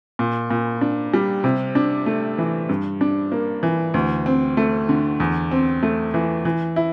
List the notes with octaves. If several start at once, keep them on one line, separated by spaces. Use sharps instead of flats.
A#2
A#2
D4
G3
C3
D4
A3
E3
G2
D4
A#3
E3
D2
C4
A3
D3
E2
C4
A3
E3
E3
E4